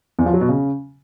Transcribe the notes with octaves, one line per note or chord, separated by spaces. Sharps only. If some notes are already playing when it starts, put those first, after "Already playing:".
E2
F3
F#3
B2
C#3